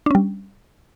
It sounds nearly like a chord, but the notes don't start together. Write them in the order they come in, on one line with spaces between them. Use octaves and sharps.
D4 C#4 G3